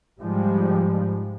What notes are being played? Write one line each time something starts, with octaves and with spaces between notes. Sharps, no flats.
G#2 F3 G3 G#3